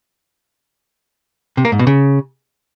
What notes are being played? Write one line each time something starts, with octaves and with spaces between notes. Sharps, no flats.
C3
A#3
G#2
B2
C#3